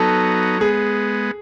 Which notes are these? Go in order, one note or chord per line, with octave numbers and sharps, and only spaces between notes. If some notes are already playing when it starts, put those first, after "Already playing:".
Already playing: F#3 B3 D#4 A4
G#3 B3 G#4